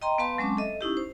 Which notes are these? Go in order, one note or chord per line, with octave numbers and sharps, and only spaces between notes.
D#5 G5 A#5 C6
B3 B4 F5 A5 C6
F#3 G#3 C4 C#4 A5 D6
A4 D#5 E5
C#4 D#4 E4 G4
C5